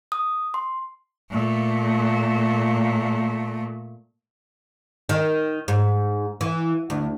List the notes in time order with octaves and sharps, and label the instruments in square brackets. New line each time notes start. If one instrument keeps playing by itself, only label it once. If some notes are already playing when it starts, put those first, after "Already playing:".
[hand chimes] D#6
C6
[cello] A#2 A3
[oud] D#3
G#2
E3
D2